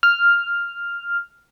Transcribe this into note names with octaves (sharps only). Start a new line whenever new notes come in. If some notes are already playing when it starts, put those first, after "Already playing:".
F6